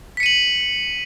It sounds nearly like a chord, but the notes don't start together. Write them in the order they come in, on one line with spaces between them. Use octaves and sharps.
B6 C#7 D#7 F#7